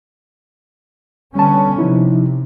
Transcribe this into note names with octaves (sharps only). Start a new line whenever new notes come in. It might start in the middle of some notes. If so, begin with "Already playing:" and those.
D3 G3 B3 C#4 A5
C3 F3 D#4 E4